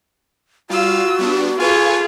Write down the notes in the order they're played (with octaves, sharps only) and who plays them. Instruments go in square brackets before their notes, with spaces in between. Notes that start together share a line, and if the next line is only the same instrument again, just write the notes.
[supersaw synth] G3 F5 [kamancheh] F4 E6 [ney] F#4
[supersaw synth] G3 B3 D4
[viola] F4 G#4 [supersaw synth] A4 B4 F5 [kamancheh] G#5 C#6